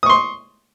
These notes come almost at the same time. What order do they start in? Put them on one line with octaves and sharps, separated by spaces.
D#6 C#6 C6